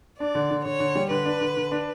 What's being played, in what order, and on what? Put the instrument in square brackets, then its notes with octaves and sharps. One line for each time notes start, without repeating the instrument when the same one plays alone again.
[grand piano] D4 [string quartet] D5
[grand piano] D3
D3
[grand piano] D3 [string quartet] C#5
[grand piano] D3
G3
[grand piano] D3 [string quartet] B4
[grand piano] D4
D3
D3
D4